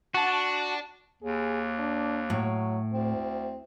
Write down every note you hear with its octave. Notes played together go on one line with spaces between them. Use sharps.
D4 F#4 F#5 A5
D#2 G#4
D4
A2 F#3
D2 C4